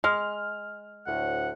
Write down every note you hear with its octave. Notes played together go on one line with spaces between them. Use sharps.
G#3 F6
D2 A2 F#5